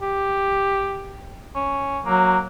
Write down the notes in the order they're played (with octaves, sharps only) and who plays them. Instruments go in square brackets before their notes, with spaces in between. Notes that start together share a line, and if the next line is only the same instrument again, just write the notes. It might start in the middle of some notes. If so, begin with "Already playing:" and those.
[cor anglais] G4
C#4
[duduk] F#3 [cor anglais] A#3